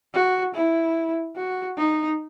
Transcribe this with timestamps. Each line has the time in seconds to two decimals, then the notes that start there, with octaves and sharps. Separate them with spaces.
0.14 F#4
0.54 E4
1.36 F#4
1.77 D#4